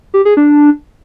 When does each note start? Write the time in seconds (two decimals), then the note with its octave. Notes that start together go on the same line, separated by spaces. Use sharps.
0.14 G4
0.25 G#4
0.37 D4